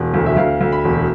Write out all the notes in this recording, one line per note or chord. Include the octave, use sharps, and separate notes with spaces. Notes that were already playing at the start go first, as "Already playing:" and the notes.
Already playing: E1
D2
E5
D2 F5
D2
B5
E1